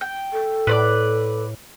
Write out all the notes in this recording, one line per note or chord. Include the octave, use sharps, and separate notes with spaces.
G5
A4
A2 B4 C5 D5